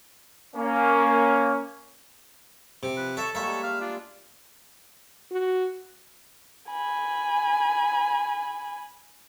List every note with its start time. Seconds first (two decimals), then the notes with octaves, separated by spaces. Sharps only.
0.56 A#3 C#4
2.83 C3
2.97 F3 B4
3.17 A4 C#5 E5
3.35 G3 G#3 A#3 C#5 E5
3.63 D5 F5
3.81 D4 F4
5.31 F#4
6.72 G#5 B5